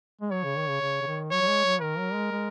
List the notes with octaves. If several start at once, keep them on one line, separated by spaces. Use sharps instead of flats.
G#3
F#3 C#5
C#3
D#3
C#3
C#3
C#3
D#3
F#3 C#5
F#3
G#3
F#3
D#3 A#4
F#3
G#3
G#3